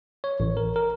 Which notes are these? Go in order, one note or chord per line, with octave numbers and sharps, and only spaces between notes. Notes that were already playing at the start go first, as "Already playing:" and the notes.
C#5
A1
A#4
A#4